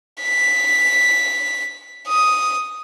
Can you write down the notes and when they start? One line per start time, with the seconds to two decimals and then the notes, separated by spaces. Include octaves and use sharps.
0.23 B6
2.08 D#6